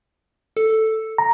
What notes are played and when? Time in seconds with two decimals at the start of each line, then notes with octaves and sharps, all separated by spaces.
0.57 A4
1.18 A#5